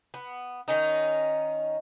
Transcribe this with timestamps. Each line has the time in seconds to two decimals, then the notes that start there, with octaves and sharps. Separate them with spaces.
0.14 B3
0.68 D#3 C#4 D#4